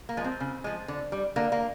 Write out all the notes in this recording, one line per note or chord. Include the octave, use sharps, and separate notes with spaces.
A#3
F3 G#3
C4
C#3
F3 G#3
D3
G3
D3 A#3
A#3